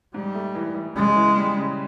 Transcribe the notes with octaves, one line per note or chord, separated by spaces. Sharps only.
G#2 G3
A3
E3
E3
C#3 G#3
E3
G3
C#3